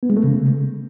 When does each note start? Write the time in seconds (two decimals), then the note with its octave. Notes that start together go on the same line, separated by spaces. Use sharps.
0.03 B3
0.10 G#3
0.17 A3
0.24 C#3